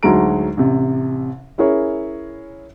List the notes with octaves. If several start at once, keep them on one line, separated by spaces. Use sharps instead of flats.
D2 F#3 G#3 D#4 A#5 D7
A1 C3
C#4 E4 G#4 A#4 C#5